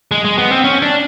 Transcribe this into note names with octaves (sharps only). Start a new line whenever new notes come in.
G#3
G#3
B3
C4
C#4
D4